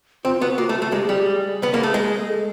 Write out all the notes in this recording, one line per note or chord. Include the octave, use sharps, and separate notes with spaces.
C4 F4
B3 F#4
A#3 F4
A3
F#4
A3
G#3 G4
G#4
G3
G4
G#4
B3
A#3
A3
G#3
A4